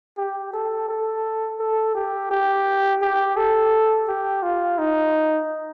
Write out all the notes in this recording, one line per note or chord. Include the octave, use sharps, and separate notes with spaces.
G4
A4
A4
A4
G4
G4
G4
A4
G4
F4
D#4